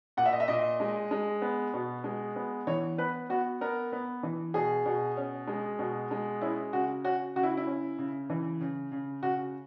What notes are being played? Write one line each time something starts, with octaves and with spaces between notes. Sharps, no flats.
A#2 F#5
E5
D#5
E5
A#2 D#5
G#3
G#3
B3
B2
G#3
B3
E3 C#5
B3 B4
B3 F#4
B3 A#4
B3
E3
B2 G#4
B2
C#4
G#3
B2
G#3
C#4 E4
C#3 F#4
C#4 F#4
C#3 F#4
E4
E4
C#4
C#3
E3
C#3
C#3
C#3 F#4